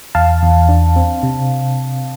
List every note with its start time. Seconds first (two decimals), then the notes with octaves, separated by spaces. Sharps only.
0.15 E2 F5 A5
0.42 E2
0.69 D4
0.96 C4
1.23 C3